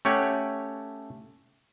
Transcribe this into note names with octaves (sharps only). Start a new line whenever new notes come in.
A3 C#4 G4 C#5 F#5